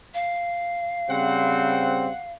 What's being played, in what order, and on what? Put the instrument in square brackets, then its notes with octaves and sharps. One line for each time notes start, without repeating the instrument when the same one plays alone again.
[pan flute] F5
[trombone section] C#3 G3 C4 [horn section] F#5